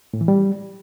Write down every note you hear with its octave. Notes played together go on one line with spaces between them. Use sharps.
A2
E3
G3